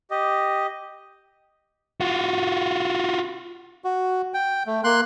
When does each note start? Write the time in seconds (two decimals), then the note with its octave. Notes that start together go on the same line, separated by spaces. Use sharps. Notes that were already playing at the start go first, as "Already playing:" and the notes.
0.11 G4 D#5
2.01 F4 F#4
3.84 F#4
4.34 G5
4.67 A3
4.84 A#3 C6 F#6